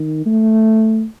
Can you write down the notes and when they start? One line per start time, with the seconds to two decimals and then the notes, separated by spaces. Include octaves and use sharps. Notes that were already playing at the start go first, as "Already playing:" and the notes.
Already playing: D#3
0.26 A3